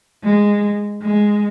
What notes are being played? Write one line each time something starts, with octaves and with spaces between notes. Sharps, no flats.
G#3
G#3